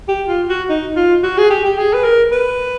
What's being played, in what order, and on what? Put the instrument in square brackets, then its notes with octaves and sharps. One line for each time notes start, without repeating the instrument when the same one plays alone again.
[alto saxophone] G4
F4
F#4
D#4
F4
F#4
G#4
G4
G4
G#4
B4
A#4
B4